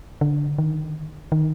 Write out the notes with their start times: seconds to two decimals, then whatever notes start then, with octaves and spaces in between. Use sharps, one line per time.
0.21 D3
0.58 D#3
1.32 D#3